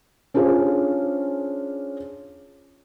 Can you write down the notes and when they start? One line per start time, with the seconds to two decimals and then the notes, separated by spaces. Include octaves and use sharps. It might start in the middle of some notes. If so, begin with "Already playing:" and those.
0.34 C#4 D4 F4 G#4 C5